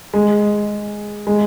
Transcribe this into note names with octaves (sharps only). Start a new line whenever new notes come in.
G#3
G#3